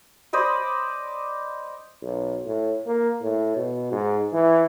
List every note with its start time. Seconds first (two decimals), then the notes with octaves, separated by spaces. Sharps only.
0.33 C5 D5 D#5 B5
2.02 B1
2.46 A2
2.86 A#3
3.22 A2
3.56 B2
3.92 G#2
4.33 E3